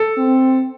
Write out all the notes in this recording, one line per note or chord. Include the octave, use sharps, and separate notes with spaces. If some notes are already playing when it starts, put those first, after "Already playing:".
Already playing: A4
C4